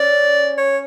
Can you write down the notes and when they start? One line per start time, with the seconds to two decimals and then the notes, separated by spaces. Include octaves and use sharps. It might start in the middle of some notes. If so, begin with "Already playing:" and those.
Already playing: C#4 D5
0.58 C#5